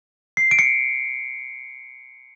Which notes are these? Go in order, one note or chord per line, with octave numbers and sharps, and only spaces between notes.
C7
D7
C#7